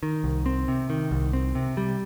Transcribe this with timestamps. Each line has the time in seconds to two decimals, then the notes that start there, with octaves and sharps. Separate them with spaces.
0.03 D#3
0.24 C2
0.46 C4
0.68 C3
0.90 D#3
1.11 C2
1.33 C4
1.55 C3
1.77 G3